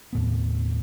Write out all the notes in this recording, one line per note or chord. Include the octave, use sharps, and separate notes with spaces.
D#2 A2 B3